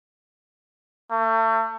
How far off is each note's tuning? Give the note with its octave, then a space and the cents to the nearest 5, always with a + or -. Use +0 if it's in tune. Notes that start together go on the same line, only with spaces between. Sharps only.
A3 +35